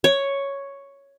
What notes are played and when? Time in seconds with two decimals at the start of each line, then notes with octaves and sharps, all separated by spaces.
0.04 C#5